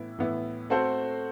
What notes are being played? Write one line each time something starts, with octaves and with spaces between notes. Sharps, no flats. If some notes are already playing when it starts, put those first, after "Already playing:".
Already playing: A2 E3 B3 E4
A2 E3 B3 E4
A3 C4 F#4 A4 C5